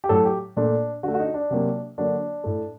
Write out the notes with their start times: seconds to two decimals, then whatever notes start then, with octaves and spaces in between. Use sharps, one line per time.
0.04 G4
0.09 A2 F#3 A3 A4
0.25 G4
0.57 A#2 A3 D4
1.03 D3 F#4
1.08 A3
1.14 F#4
1.19 D#4
1.34 D4
1.50 C3 F#3 A#3
1.98 D3 F#3 A#3 D4
2.44 A2 A3